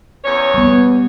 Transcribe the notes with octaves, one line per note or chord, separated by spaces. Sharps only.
E2 C#4 C#5
G3 B3